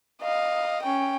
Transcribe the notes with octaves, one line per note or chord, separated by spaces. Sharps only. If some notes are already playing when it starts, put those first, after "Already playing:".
D#5 F5
C#4 G5